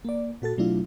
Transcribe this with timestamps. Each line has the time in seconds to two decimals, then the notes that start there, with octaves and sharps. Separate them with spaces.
0.05 A#3 D5
0.42 A#2 F#4 A4 A6
0.58 B2 F#3 A3 D4 E4 F4